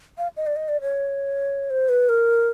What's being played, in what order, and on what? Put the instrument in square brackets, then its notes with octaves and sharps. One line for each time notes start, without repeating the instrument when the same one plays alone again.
[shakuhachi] F5
D#5
D5
D#5
D5
C#5
C5
B4
A#4